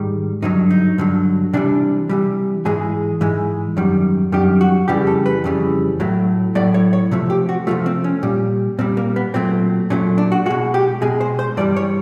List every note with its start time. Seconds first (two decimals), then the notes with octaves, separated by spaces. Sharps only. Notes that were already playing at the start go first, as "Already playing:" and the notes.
Already playing: G#2 D#3 G3
0.42 G2 D3 F#3 D#4
0.70 D#4
0.98 G2 D3 F#3
1.53 C3 E3 G3 D4
2.09 C3 E3 G3
2.65 G#2 E3 G#3 G#4
3.21 G#2 E3 G#3
3.77 F#2 D#3 G3
4.32 F#2 D#3 G3 G4
4.61 F#4
4.88 F2 C#3 E3 G3 G4
5.07 A4
5.26 B4
5.44 F2 C#3 E3 G3
6.00 A2 F#3 A3
6.55 A2 F#3 A3 D5
6.74 C#5
6.93 C#5
7.11 C3 F3 A3
7.30 G4
7.49 F#4
7.67 C3 F3 A3 F4
7.86 C4
8.04 C#4
8.23 A#2 G3
8.79 A#2 G3 C4
8.97 A#3
9.16 B3
9.34 A#2 F#3 A3 C4
9.90 A#2 F#3 A3 C#4
10.18 D4
10.32 F#4
10.46 G#3 F#4
10.50 B2
10.74 G4
11.02 B2 G#3 G#4
11.21 C5
11.39 C5
11.57 G2 E3 G3 D5
11.76 C#5